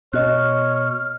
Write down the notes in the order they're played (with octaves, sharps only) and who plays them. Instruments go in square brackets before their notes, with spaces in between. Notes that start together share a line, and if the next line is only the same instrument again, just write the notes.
[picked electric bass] B2 [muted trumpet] C#5 [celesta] D#5 F#6 [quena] F6